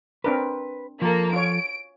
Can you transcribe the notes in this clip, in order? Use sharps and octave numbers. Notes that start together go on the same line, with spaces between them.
C4 D4 A#4 B4
F3 A#3 A4
F4 C#5 D7